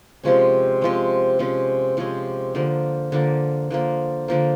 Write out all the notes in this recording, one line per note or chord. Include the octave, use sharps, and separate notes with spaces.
C3 F3 G#3 C#4
C3 F3 G#3 C#4
C3 F3 G#3 C#4
C3 F3 G#3 C#4
D3 F3 A#3
D3 F3 A#3
D3 F3 A#3
D3 F3 A#3